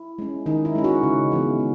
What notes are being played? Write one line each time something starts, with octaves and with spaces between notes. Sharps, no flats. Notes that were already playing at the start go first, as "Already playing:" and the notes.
Already playing: E4
G#3 C#4
D#3 D#4
E4
G#3 C#4
F#4
C#3
E3 G#3 B3
C#3